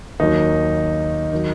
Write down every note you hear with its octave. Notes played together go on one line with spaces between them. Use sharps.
D#2 D#3 F#3 D#4
D#3 F#3